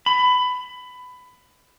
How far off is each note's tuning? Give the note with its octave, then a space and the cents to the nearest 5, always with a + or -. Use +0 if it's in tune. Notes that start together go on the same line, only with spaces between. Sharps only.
B5 +20